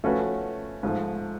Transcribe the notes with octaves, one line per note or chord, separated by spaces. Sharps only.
F3 A3 C#4 F#4 B4
G#2 F3 A3